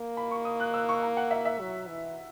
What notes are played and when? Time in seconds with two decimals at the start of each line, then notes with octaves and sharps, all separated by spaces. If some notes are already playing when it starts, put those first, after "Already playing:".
Already playing: A#3
0.17 B5
0.31 C#6
0.45 D#6
0.60 F#6
0.74 E6
0.89 C#6
1.03 A#5
1.17 F#5
1.31 E5
1.45 E5
1.60 F#3
1.88 E3